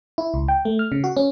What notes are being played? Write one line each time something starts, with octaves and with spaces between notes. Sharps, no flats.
E4
C#2
G5
A3
F6
C#3
F#4
C#4